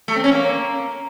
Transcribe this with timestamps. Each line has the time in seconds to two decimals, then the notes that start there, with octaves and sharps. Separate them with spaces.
0.08 A3
0.16 C4
0.24 C#4
0.32 A#3